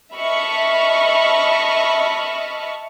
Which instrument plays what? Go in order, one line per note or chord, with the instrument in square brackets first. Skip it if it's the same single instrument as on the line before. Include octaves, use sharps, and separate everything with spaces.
[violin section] D#5 E5 A5 B5 C#6 F6